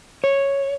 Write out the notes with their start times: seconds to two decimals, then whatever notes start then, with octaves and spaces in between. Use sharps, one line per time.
0.24 C#5